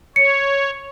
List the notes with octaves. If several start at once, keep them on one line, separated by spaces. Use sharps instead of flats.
C#5 C#7